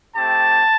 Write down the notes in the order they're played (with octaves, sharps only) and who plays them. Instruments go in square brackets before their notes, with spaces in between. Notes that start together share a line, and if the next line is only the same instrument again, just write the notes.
[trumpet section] A3 C4 G4 A5